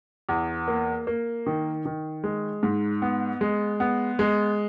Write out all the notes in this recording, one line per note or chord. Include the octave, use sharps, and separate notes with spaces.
E2
A#3
A#3
D#3
D#3
G#3
G#2
B3
G#3
B3
G#3